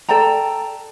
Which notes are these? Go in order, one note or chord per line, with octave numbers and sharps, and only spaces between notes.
A4 D5 G5 A#5